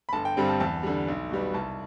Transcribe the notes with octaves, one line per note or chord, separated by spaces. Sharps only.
B5
G1 A5
G5
G2 D3 G3 C4
A5
E2 A5
D3 G3
B1
B2 G3 B3
C2 A5